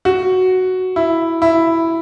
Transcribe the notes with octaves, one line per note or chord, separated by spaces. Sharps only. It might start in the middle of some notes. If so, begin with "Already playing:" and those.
F#4
E4
E4